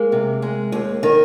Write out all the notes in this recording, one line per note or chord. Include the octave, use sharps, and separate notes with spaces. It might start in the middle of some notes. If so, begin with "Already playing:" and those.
Already playing: G#3 A#3
C3
G#3
D#2
D#3